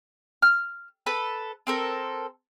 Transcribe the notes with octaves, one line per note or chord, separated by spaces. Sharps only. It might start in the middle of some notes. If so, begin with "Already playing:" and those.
F6
A4 B4 B5
C4 A4 A#4